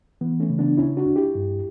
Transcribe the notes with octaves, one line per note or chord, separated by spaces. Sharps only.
E3 B3
A3 C#4
C#3
B3 D4
D2 C#4 E4
D4 F#4
D2
E4 G4
G2